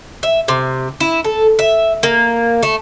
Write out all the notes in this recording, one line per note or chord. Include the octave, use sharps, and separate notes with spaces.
E5
C3
E4
A4
E5
A#3
A3